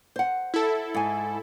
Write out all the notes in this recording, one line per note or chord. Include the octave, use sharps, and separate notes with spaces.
C5 F#5
E4 A4
G#2 G#5